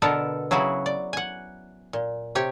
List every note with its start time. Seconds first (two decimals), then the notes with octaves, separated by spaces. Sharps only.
0.02 B2 D3 B3 A4 A#4
0.51 C#3 F#3 E4 F#4 G#4
0.86 D5
1.13 F#5 G#5
1.93 A#2
2.35 C3 G4 C#5